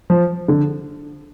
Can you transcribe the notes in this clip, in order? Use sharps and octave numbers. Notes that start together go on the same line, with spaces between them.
F3
D3